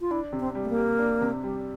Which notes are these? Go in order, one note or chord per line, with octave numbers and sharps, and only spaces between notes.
F4
D4 E4
C3
C4
G3
A3
A#3
G4
D4
C3
G3